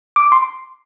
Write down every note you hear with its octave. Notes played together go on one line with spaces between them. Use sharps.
D6
C6